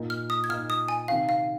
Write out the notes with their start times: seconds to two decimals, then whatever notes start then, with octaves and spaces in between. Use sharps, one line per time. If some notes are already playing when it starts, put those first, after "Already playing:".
Already playing: A#2 A#3 D#4
0.10 F6
0.30 D#6
0.44 G#6
0.49 A#2 A#3 D#4 F6
0.70 D#6
0.88 G#5
1.08 C3 D#3 C4 F5
1.29 F5